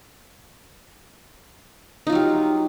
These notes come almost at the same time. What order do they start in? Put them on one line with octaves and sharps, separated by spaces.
D#4 F4 F#3 G4